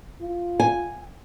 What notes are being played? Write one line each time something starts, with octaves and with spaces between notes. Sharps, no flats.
F4
G#5